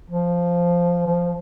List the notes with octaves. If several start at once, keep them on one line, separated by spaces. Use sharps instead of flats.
F3
F3